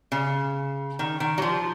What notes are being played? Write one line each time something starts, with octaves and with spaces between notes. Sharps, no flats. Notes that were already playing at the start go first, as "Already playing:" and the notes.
C#3
D#3
D#3
F#3
F3